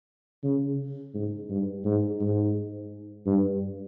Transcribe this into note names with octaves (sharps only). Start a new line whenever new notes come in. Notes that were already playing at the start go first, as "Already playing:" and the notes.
C#3
G#2
G2
G#2
G#2
G2